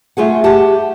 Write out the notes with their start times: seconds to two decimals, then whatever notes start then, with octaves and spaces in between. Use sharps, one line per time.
0.17 A3 F4 G#4 F#5
0.44 G4 F#5 A5